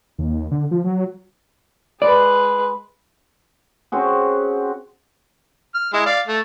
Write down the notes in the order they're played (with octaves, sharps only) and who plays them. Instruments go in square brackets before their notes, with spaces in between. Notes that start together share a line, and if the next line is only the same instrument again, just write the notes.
[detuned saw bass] D#2
D3
F3
F#3
[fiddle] G#3 B4 [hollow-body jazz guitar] D5
[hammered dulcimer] C4 C#4 F#4 G#4
[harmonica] F6
G#3 E4
D5 F5
A3